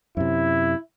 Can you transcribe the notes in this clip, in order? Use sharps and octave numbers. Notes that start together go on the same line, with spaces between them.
F#2 C3 E4